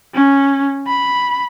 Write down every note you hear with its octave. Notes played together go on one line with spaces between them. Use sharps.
C#4
B5